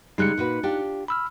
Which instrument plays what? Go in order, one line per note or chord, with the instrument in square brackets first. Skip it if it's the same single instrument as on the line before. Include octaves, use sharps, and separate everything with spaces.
[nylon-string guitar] C#3 G3 G#3 [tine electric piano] D#4 F#6 C#7
[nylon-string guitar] A#2 F#4 B4
D4 F4 G4
[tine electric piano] B5 E6 F6